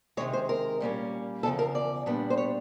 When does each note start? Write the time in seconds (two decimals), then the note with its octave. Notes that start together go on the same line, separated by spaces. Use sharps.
0.17 C3 D#3 G#3 C#5
0.33 C5
0.49 A#4
0.80 A#2 G3 A#3 C#4
1.43 E2 C#3 F3 A4
1.59 A#4
1.75 D5
2.06 A#2 G3 B3 D4
2.30 C5
2.38 C#5